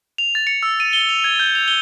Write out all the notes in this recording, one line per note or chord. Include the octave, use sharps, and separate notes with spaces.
F7
A6
C#7
E6
D#7
G7
F7
G#6
G6
F7
G7